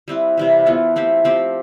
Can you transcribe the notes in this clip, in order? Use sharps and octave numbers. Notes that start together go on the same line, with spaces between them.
G3 C4 E4 B4
C3 E3 G3
E3 B3 F4 A4
A3 C4 G4 C5
F3 C4 G4 C5